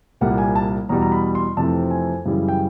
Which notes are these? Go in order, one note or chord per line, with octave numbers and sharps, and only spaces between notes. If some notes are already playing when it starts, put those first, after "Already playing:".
C2 A#2 G3 A#3 F#5
G#5
A5
E2 B2 G3 A#5
A#5
B5
C6
F2 C3 E3 A3 A5
G#5
F#2 C#3 E3 G3
G5